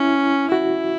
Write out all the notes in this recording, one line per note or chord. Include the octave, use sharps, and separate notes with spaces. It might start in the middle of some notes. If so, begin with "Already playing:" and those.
Already playing: C#4 E4
E4 F#4